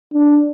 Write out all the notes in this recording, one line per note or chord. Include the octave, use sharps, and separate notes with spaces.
D4